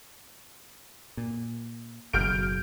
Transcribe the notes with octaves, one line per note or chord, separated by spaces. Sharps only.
A#2
F#1 B2 F6 G6 D7